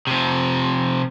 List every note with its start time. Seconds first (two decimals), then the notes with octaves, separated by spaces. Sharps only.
0.07 C3 F3